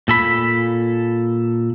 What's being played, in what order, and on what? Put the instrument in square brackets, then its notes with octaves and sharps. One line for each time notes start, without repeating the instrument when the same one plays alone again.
[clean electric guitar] A#2 A4 B5